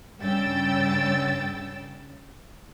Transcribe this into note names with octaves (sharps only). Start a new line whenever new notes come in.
G2 C#3 G5 E6 A6